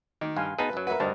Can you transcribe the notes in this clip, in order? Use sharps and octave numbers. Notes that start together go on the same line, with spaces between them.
D#3 D6
G2 F5 G#5 C6
B3 D#4 G#4 B4 A5
F#2 F#3
A#4 B4 E5 F#5
D2 G2 C5 D5 D#5 A5